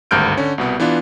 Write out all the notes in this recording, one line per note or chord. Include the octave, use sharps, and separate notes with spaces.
G#1 D2 G2 F6 G6 D7
D3 C#4
C2 B2 B3
E3 B3 D4 F4